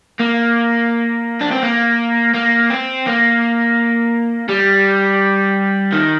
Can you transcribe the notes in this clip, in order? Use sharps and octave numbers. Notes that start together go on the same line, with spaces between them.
A#3
D4
C4
A#3
A#3
C4
A#3
G3
D#3